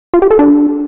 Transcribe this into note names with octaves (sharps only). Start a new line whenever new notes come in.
F4
G4
A4
D4